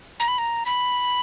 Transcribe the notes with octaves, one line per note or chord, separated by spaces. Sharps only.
A#5
B5
A#5
B5